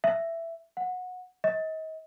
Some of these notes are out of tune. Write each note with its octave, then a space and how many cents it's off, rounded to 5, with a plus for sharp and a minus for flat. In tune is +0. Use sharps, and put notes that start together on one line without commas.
E5 +10
F#5 -20
D#5 +35